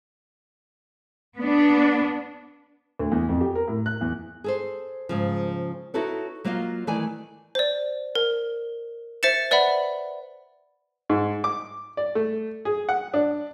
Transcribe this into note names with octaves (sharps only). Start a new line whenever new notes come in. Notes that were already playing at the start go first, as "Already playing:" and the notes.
B3 D4
D2
E2
F2
G4
A#4
A2
F#6
E2
G#4 A4 C5
G#2 C#3 F3
D#4 E4 F#4 A4 B4 C#5
F#3 A#3 F4 F#4 D#5
D#3 E3 A3 D5 G#5
C5 D5
A#4
C5 E5 A6 C#7 E7
B4 D5 E5 F#5 B5
G#2
D6
D5
A3
G#4
F#5
D4